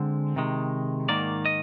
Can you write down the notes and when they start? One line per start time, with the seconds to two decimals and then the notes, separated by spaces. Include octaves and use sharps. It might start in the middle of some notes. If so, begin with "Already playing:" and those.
Already playing: D3 G#3 C4
0.36 C3 D#3 G#3
1.09 G#2 D#3 A#3 D5
1.46 D#5